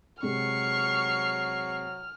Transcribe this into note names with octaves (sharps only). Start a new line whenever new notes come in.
C3 F#3 G#3 C#6 F6 C7